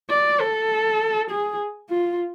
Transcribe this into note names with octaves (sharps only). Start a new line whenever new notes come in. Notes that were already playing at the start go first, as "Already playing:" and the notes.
D5
A4
G#4
F4